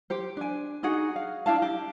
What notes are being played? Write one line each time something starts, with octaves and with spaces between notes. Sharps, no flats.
G4 C5
D4 G#5
D#4 F#4 G#4 F#5
F5
D4 E4 F5 A5
G4